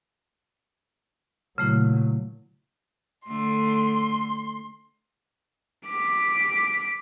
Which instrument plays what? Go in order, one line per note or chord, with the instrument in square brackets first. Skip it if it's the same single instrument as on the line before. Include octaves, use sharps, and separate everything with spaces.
[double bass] A#2 F#3 [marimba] C#3 A3 E4
[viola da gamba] D3 A3 [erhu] C6
[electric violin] D6 B6